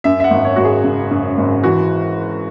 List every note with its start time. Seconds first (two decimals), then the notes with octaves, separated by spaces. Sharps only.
0.04 F#2 E5
0.20 E5
0.24 F#5
0.31 G#1
0.45 C#5
0.56 G#1 F#4
0.65 G#4
0.84 C#3
1.11 F#2
1.38 G#1
1.64 E3 F#4